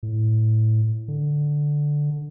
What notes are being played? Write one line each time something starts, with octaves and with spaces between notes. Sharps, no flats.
A2
D3